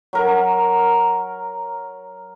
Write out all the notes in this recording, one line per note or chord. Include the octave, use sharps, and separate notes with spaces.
F#3 A#4